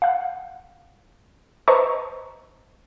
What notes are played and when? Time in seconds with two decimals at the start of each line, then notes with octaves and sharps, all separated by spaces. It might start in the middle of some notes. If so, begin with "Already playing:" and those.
0.02 F5 F#5
1.68 B4 C5 D#5 A5 A#5 C#6